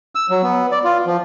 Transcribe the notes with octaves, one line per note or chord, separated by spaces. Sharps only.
E6
F#3
B3
D5
F4
F3